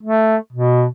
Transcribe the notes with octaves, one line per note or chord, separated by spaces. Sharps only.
A3
B2